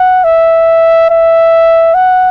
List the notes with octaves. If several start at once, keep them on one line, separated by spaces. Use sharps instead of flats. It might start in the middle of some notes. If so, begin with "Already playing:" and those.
Already playing: F#5
E5
E5
F#5